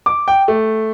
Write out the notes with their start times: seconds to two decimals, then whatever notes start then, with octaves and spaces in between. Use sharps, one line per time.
0.06 D6
0.28 G5
0.48 A3